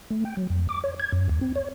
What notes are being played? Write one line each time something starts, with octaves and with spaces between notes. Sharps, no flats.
A3
G5
F#3
F2
D6
C#5
G#6
F#2
D#2
C4
C#5